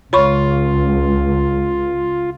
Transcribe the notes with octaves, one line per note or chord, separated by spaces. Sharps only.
C#2 F4 C#5 B5 C#6